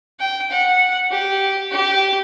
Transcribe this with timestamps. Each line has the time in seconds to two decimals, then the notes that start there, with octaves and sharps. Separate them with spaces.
0.20 G5
0.51 F#5
1.11 G4
1.71 G4